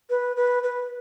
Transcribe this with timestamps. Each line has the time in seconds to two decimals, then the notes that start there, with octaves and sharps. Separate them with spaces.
0.10 B4
0.37 B4
0.63 B4